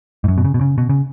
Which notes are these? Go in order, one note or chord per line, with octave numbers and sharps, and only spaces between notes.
G#2
F#2
B2
C#3
B2
C#3
B2
C#3